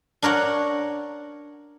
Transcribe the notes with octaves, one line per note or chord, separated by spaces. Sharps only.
D4 A#4 C#5 F#5